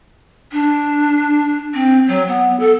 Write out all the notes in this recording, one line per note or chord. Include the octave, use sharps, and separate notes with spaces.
D4
C4
F#3
B3
A4